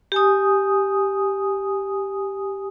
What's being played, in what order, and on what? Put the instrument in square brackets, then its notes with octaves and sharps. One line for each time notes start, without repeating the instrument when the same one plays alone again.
[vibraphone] G4 G#5 D#6